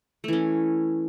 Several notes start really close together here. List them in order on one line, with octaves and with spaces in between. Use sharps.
A3 E3 C#4